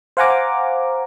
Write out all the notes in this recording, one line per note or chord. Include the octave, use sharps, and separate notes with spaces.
C5 F5 F#5 G#5 A#5 D6